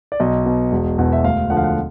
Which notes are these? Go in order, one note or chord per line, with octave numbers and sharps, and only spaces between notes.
D5
B1 D#5
B2
E1
E2 B2
E5
D2 F5
D3 F3 F#5
F5
F#5